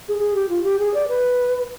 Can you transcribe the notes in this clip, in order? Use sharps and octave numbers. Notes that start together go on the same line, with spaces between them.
G#4
G#4
G4
F4
G4
G#4
D5
B4